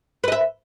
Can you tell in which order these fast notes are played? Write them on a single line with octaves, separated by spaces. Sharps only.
B4 D#5 E5